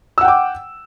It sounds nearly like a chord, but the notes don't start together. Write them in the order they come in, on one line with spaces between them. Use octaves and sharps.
E6 F#5 G5 D6